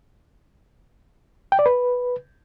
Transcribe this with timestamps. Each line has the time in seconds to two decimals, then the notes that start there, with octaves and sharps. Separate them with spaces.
1.52 G5
1.59 D5
1.66 B4